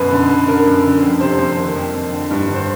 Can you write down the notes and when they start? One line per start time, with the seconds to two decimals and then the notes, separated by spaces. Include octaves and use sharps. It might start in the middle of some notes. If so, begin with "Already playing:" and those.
Already playing: F#2 B2 B4
0.11 D3
0.29 D3
0.48 D3 A#4
0.67 F#2
0.84 D3
1.02 F2
1.20 C3 C5
1.39 F2 C5
1.58 D#3
1.76 F2
1.94 F2
2.13 D3
2.31 G2
2.48 D3
2.55 C5